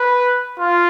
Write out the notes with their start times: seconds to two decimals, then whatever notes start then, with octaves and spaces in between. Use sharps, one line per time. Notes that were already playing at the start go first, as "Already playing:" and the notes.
Already playing: B4
0.59 F4